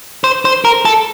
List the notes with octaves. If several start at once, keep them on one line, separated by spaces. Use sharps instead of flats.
C5
C5
A#4
A4